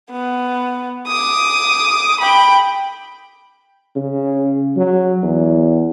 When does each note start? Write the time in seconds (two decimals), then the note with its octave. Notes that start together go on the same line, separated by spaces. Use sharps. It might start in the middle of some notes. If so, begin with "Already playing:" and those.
0.11 B3
1.07 D6 D#6
2.20 G5 B5
3.96 C#3
4.77 F#3
5.23 E2